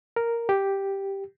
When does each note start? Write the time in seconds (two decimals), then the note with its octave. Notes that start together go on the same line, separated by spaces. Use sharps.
0.16 A#4
0.49 G4